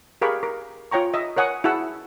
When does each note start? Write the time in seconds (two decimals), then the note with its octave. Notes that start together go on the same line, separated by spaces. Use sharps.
0.22 G4 G#4 A#4 F5 B5 C#6
0.43 A#4
0.91 F4 C#5 G5 A#5 C#6
1.14 D#5 E5
1.37 A#4 C#5 F#5 G#5 D#6
1.64 E4 F#4 G#4 F#5 A5 E6